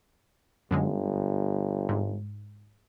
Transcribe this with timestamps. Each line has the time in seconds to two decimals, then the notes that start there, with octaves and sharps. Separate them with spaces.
0.71 G1 F#2 D3 G#3
1.89 G#2